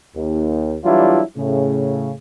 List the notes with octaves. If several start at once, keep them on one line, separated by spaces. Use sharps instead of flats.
D#2
E3 F#3 G3 D4 E4 F4
A2 C#3